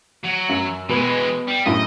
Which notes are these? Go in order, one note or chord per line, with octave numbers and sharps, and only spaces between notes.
F#3
F#2
B2 E3 G#3 B4
G3
F#2 A2 D#5